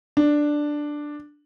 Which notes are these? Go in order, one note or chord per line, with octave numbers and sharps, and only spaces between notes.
D4